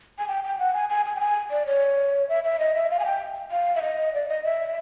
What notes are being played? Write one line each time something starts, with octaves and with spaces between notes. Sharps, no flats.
G#5
G5
G5
F#5
G#5
G#5
G#5
G5
G#5
D5
C#5
E5
E5
D#5
E5
F5
G#5
G5
F5
E5
D#5
D5
D#5
E5